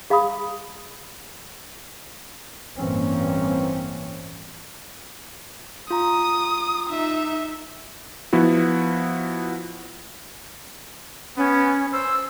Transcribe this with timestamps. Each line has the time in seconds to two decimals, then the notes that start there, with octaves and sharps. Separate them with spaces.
0.10 G#4 F5 A#5 B5 D#6
2.77 A1 G2 E3 A#3 C4 C#4
5.90 F4 A#5 D#6
6.90 D#4 E5
8.33 F3 B3 E4 F#4
11.37 B3 C#4
11.93 C5 E6